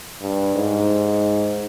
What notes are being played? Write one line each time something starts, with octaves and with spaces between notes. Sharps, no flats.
G2
G#2